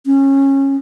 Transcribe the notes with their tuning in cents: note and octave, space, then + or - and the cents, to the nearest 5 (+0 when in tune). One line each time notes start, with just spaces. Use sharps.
C#4 -20